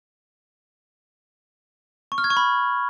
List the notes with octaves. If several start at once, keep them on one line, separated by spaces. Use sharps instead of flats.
C#6
F6
G#6
C#6
B5